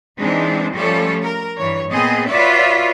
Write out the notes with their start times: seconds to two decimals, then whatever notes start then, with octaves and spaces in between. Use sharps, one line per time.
0.19 E3 G#3 C4 D4 D#4
0.73 F3 G3 A3 C#4 A4 C#5
1.25 A#4
1.57 G2 E3 C#5
1.90 A#2 B3 C4 G#4 D#5
2.28 F4 F#4 B4 C#5 D5 E5